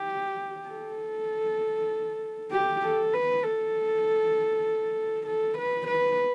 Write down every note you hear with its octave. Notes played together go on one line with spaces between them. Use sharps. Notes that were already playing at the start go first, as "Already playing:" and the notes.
Already playing: G4
A4
G4
A4
B4
A4
A4
B4
B4